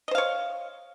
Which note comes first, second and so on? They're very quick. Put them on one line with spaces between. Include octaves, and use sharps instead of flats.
D#5 C5 F5 C#5